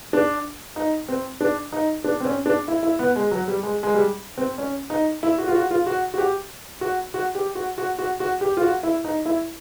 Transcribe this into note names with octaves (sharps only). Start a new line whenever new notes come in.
D4
D#4
C4
D4
D#4
D4
C4
C#4
D4
E4
E4
B3
G#3
F#3
G3
G#3
G#3
G3
C4
C#4
D#4
E4
F#4
F4
F#4
F4
F#4
F#4
G4
F#4
F#4
G4
F#4
F#4
F#4
F#4
G4
F4
F#4
E4
D#4
E4